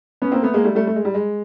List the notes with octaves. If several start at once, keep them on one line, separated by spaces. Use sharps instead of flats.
B3 C#4
A#3 C4
A3 B3
G#3 A#3
G3 A3
G3 A3
A3
G#3
G3
G#3